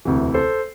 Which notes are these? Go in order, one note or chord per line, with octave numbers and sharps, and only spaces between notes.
E1 D2 C3 E3
A4 C5